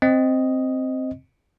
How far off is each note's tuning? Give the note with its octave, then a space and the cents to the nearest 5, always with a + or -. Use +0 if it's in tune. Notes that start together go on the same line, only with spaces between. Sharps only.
C4 +0 D#5 +0